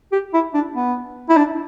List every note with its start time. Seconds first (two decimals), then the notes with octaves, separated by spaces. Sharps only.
0.12 G4
0.33 E4
0.54 D4
0.75 B3
1.29 E4
1.37 D4